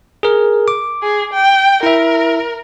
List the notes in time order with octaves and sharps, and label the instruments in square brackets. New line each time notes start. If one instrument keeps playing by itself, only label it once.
[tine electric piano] G#4 A#4
D6
[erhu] G#4
G5
[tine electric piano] E4 E5 [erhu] A#4